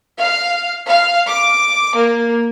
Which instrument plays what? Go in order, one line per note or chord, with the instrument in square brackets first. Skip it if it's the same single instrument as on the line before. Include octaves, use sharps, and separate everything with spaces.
[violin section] F5
F5
D6
A#3